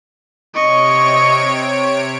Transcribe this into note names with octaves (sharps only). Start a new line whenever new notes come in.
C3 C#5 D#5 C#6 D7